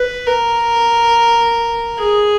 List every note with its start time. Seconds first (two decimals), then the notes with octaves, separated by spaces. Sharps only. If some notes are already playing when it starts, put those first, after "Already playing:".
Already playing: B4
0.27 A#4
1.98 G#4